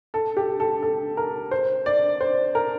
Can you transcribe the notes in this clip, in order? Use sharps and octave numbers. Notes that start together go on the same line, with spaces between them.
A4
G4
A4
A4
A#4
C5
D5
C5
A#4